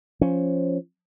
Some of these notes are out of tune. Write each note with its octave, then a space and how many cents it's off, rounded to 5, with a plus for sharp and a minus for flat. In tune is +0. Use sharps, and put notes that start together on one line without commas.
F3 +0 C#4 +0